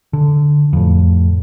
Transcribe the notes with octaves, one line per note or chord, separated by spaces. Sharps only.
D3
F2 A2